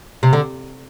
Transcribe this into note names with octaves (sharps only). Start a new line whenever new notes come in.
C3
D3